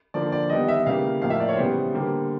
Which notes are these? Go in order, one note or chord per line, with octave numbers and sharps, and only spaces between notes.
D3 F3 A#3 D5
D5
D#3 G3 B3 D#5
E5
C#3 E3 G3 A#3 F5
A2 F3 A#3 F5
E5
D5
C#5
C#3 E3 G3 B3 C5
D3 G3 A#3